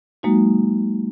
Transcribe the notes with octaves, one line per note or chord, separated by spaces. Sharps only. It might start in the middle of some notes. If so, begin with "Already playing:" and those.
F#3 G#3 A#3 D#4 F#4